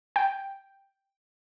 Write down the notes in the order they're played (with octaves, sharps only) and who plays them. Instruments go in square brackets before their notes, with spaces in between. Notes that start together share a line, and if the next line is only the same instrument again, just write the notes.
[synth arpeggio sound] G5